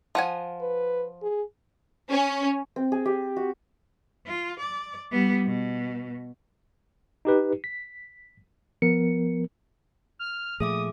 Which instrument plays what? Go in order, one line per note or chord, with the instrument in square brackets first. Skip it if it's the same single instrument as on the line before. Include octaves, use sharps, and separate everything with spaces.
[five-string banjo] F3 F#5 G#5
[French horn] B4
G#4
[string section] C#4
[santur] C4
G#4
G4
F#4
[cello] F4
D5
G3 B3
B2
[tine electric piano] D#4 G4 B4
B6
[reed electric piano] F3 B3 A#4 [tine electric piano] C#7
[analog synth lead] F6
[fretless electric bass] A#2 F3 A3 [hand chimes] G#4 E5 D6 [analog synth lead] D#6